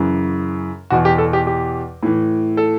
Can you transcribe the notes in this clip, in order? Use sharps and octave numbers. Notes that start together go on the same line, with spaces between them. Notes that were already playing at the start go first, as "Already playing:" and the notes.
Already playing: F#2 C#3 E3
E2 B2 F#4
G4
A4
G4
G4
A2 E3
A4